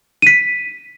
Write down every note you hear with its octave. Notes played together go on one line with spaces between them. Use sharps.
B6 D#7